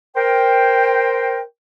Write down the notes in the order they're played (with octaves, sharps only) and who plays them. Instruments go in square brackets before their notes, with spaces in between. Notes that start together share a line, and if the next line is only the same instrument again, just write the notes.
[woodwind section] A#4 C5 G5